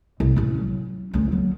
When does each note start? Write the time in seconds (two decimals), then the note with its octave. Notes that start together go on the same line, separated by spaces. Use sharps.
0.20 C2
0.36 A1 C#4
0.55 F#3 C#4
1.14 D2 C#4
1.32 F#3 A#3